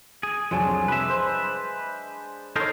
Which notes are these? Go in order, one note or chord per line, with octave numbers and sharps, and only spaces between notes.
G#4
C2 F2 F#3 G#3 D4
B4 E5
C5
D#4 A4 A#4 C5 C#5